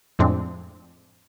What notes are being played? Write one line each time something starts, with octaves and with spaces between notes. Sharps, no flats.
F2 A2 F3 G#3 C4 D4